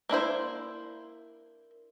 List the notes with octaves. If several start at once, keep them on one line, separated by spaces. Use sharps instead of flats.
A#3 D4 E4 C5